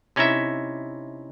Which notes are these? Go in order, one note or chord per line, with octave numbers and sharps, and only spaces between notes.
C3 C#4 D#4 E4 E5